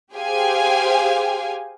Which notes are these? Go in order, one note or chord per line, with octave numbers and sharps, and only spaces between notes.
G4 G#4 C5 F5 G5 G#5